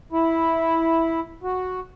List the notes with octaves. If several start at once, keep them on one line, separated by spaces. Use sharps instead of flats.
E4
F#4